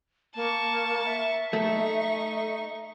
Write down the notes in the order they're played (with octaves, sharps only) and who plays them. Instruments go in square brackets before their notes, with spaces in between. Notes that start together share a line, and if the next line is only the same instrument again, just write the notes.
[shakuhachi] A#3 [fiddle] A5 C#6
[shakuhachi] E5
[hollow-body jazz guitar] A3 [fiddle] D#4 C#6